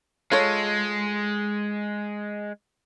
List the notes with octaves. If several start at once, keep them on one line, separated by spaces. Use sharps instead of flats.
G#3 F4 A4 C#5